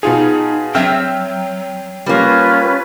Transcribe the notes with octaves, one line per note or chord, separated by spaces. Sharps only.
B2 D#4 F4 G#4
F#3 C4 E5 G5 E6 F6
G3 A#3 C#4 F4 B4